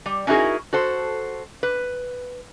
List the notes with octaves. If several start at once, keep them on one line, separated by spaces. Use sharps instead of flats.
G3
C#4 D#4 E4 F#4 G#4 A#4
F#4 A4 C5
B4